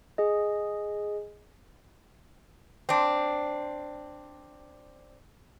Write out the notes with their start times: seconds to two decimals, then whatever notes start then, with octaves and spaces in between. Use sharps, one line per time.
0.18 G#4 D#5
2.89 C4 D4